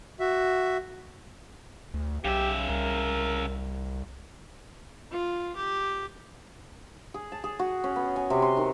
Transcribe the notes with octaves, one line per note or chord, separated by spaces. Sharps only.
F#4 E5
D2
B1 C#3 G4 E5
C2 A#4
F4
G4
G#4
A5
G#4
F#4
C#4
B3
G#5
C3
C6
D#3